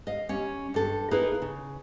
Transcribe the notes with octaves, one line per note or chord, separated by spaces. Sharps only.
D#5 F5
G3 C#4
G2 A4
A#3 D#4 E4 G#4 B4
C#3